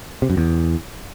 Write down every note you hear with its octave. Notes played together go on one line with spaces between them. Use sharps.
C3
F#2
E2